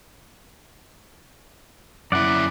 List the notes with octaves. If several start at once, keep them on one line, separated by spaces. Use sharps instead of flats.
F#2 E4 D5 F#5